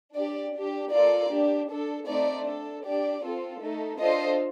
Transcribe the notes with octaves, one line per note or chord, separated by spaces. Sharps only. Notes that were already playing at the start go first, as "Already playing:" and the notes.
D4 G4 D5
D4 G4
A#3 F4 A4 D5
D4 G4
D4 A4
A3 C4 D#4 D5
D4 A4
D4 G4 D5
C4 F4 A4
A3 D#4 A4
D4 F4 A4 C5 D#5